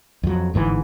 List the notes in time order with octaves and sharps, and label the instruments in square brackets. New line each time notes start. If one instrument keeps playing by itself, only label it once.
[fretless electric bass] F2 F#3
G1 G#2 C#3 E3